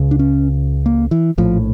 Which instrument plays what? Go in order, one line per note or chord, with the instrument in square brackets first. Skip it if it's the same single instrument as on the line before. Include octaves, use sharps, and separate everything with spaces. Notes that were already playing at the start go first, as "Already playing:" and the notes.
Already playing: [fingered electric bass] C#2 C#3
D4
C#4
A#3
E3
A#1 A2 F3